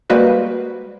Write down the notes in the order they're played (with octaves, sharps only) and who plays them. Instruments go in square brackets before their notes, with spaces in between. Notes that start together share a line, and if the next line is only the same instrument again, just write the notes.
[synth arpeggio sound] G3 G#3 A#3 F#4 B4 C5